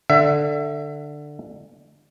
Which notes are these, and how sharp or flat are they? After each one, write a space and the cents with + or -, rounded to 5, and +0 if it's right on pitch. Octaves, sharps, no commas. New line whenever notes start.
D3 +10 E5 +25